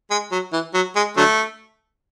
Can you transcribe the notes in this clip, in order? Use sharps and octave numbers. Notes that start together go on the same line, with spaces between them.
G#3
F#3
E3
F#3
G#3
D3 F#3 A3